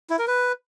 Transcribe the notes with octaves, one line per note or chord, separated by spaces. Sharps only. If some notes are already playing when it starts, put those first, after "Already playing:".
E4
A#4
B4